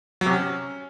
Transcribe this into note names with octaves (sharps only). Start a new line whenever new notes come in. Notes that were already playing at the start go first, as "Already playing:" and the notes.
F#3
C3
C#4